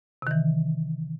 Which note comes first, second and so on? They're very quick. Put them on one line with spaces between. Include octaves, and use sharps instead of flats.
C3 D#3 E3